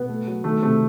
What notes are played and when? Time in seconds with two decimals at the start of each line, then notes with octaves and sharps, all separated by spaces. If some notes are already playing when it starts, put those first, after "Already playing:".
Already playing: B2 B3
0.09 A3
0.27 F#3
0.44 D#3 A3
0.62 C3 A3